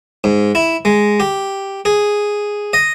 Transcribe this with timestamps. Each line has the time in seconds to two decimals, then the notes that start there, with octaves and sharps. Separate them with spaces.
0.24 G#2
0.55 E4
0.85 G#3
1.20 G4
1.85 G#4
2.73 D#5